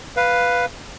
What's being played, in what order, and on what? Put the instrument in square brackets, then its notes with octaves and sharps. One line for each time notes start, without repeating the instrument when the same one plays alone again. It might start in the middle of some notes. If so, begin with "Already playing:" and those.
[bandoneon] B4 F5